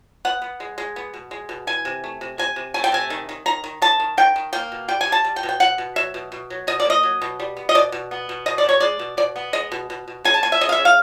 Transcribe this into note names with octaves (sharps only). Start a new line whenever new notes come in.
B3 F#5
B3
G#3
G#3
B3
B2
G#3
B2
E3 G#5
C3
A3
C3
C3 G#5
C3
A3 G#5
G5
C3 G#5
D#3
D#3
D#3 A#5
D#3
D#3 A5
D#3
D#3 G5
D#3
A#3 G5
B2
G3 G5
G#5
G3
A5
G3
G5
B2
G5
B2 F#5
B2
F#3 E5
B2
B2
F#3
B2 D#5
D5
A#3 D#5
F#3
B2
G3
B3
D#5
B2 D5
B2
B3
B2
B2 D#5
D5
B2 C#5
G#3 D5
B2
B2 D5
B3
G#3 D#5
B2
B2
B2
C#3 G#5
A5
A#3 G#5
E5
C#3 D#5
F5
E5
C#3
F5